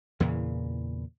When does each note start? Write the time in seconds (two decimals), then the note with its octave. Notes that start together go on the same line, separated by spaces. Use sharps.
0.20 E2 A#2 C#3 E3